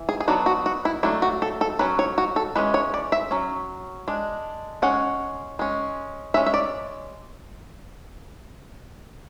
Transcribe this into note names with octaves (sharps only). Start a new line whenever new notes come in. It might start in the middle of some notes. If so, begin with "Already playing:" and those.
Already playing: E3
G#4
G#4
F#3 B3 D4 F#4
F#4
F#4
E4
F#3 A3 D4 E4
F#4
A4
A4
F#3 C#4 B4
C#5
F#4
A4
E3 G#3 C#4 B4
C#5
D5
E5
F#3 C#4
G#3 D4
G#3 C#4 F#5
G#3 C#4
G#3 C#4 E5
E5
D5